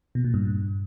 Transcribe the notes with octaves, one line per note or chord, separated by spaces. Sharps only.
B2
A#2
G2